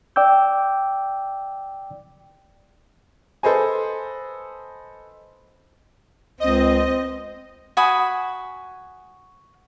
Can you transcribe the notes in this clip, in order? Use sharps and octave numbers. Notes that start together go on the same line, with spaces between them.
D5 G5 D6 E6 G6
A4 B4 C5 D#5 G#5
C#2 C4 D#5
F#4 G#5 B5 D#6